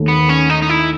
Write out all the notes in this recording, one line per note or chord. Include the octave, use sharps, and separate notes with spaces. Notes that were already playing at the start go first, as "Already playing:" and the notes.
Already playing: D#2 D#3 A3
B3
C#4
D#4
D#4
E4